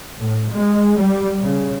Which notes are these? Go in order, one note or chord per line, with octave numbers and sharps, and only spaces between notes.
A2
G#3
G3
C#3